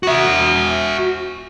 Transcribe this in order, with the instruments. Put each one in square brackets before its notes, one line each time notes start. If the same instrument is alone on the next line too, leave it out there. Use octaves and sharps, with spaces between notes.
[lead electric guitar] F#4 E5